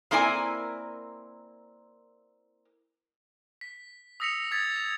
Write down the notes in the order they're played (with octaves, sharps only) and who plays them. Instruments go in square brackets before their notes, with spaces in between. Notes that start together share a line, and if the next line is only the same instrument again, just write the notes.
[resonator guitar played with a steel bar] A#3 C4 E4 A#4 D5 G#5
[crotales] B6
D#6 E6 A#6 B6 C#7 F7
D#6 G#6 A6 B6
F7